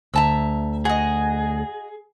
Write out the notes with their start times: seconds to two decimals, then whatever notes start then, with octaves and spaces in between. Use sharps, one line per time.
0.14 D2 E5 A5 A#5 E6
0.85 F#4 G#4 D#5